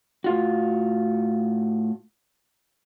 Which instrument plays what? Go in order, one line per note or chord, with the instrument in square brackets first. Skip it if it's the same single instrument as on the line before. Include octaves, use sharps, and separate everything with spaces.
[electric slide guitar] A2 F4 F#4